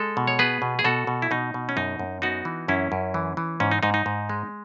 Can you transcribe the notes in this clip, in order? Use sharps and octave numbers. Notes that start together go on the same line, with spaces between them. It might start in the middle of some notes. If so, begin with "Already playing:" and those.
Already playing: G#3 A4
B2
C#5
B3 G#4 B4
B2
G#4
B2 F#4 A4
B2
E4
B2 D#4
B2
C#4
F#2 D#4
F#2
B3 D#4 F#4
E3
F#2 C#4 E4
F#2
E3
E3
G#2 C#4
D#4
G#2 D#4
D#4
G#2
G#3